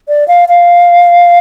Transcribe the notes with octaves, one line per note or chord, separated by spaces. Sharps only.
D5
F5
F5